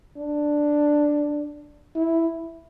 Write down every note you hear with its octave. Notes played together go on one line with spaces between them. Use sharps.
D4
E4